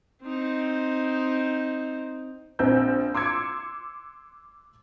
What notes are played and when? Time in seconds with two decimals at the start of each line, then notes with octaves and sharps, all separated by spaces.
0.22 C4 D#4
2.59 A#1 C4 E6 G6
3.15 C6 D6 E6 G#6 C#7